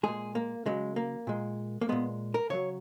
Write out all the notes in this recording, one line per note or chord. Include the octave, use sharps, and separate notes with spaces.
A#2 G#3 G#4
A#3
C#3 F#3 G#3
A#3
A#2 G#3
A#3
A#2 G#3 B3
A#4
C#3 F#3 C#5